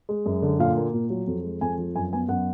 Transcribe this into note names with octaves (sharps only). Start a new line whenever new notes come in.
G#3
F#2
D3
A#2 F5
A#3
A#2
F#3
F2
G#3
F2 G#5
F3
F#2 G#5
B3 G#5
F#2 F#5